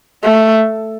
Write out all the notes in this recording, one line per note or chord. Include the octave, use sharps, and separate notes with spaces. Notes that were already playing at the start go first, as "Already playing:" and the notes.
A3